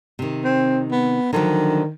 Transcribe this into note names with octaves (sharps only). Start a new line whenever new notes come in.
C3 D#3
C4
B3
D3 D#3 F3 F#3